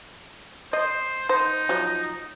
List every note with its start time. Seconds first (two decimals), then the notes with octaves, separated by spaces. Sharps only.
0.73 C5 D#5
1.29 D#4 C5
1.69 F3 F#3